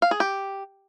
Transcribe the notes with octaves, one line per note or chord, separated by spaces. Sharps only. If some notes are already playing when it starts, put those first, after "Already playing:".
F5
G#4
G4